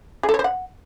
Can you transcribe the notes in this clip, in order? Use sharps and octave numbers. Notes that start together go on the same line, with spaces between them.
G#4
A4
C#5
C5
F#5